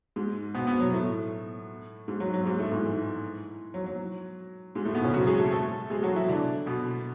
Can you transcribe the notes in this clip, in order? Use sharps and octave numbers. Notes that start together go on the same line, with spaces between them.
G#2 G#3
B2 B3
B2 B3
F#3
A2 A3
G#2 G#3
F#3
F#3
G#2 G#3
A2 A3
G#2 G#3
E3
F#3
F#3
G#2 G#3
A2 A3
B2 B3
C#3 C#4
F#3 F#4
G#3 G#4
A3 A4
A3 A4
G#3 G#4
F#3 F#4
E3 E4
D3 D4
B2 B3